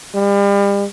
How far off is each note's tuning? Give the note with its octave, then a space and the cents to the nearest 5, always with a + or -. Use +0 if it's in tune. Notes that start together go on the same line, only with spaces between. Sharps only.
G3 +35